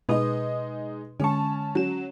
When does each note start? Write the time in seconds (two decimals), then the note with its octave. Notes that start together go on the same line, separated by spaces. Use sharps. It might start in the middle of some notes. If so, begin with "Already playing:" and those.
0.09 B2 G#3 D#4 B4 D#5 D#6
1.20 D3 G#3 C#4 A5 C#6
1.75 F#3 C#4 E7